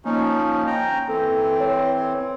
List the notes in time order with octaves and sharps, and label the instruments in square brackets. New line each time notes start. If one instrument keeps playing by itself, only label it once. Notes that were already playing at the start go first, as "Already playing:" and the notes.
[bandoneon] F3 C#4 D#4 [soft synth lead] A#3
[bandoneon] G5 A#5
[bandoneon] E3 C4 [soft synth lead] A4
[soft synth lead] C#5